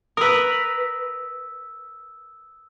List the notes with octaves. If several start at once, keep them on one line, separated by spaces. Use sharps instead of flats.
A#4 B4 D#6 E6